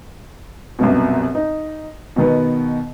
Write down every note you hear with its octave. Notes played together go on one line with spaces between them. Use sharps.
C2 F#2 B2
D#4
B2 D#3 B3